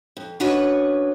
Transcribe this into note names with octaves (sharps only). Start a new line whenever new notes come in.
F2
C#4 D4 F#4 B4 C#5 D#5